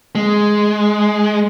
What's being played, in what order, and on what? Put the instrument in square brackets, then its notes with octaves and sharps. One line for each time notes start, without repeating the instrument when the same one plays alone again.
[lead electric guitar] G#3